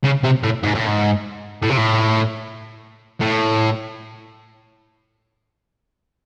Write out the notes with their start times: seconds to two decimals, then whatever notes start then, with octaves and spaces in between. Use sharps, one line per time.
0.04 C#3
0.23 C3
0.43 A2
0.63 G#2
0.75 A2
0.87 G#2
1.62 A2
1.70 C3
1.77 A2
3.21 A2